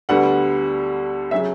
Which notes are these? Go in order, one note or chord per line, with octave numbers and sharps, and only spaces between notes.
D2 D3 G3 B3 F#5
C#3 F#3 C#4 E5